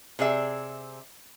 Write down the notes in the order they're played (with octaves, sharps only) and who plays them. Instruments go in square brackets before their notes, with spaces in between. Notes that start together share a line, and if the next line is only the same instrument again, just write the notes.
[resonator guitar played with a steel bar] C3 G#4 D5 E5